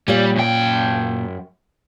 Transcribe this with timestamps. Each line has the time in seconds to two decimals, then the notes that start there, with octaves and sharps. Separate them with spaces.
0.08 A#2 G3 C#5 F5
0.36 F#2 G5